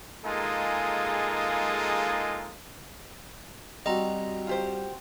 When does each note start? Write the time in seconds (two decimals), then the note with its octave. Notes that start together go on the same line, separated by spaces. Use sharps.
0.25 G#3 A#3 D#4 F4 G#4 A4
3.86 G3 C4 F#4 D#5 A#5
4.47 F4 G4 C5